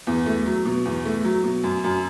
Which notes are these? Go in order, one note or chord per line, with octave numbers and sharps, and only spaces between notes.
E2
A3
F#3
B2
E2
A3
F#3
B2
F#2
F#2